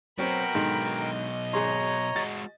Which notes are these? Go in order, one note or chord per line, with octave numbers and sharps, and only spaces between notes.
F#3 B3 C4 F#4 A#4 G5 B5
G#2 B2 D3 D#3 F#3
D#5
G#1 G#4 C#5 A#5 C6
G#3 F#4 A6